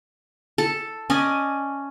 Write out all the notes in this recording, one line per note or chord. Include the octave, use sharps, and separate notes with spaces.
A4
C#4 D5 D#5 G#5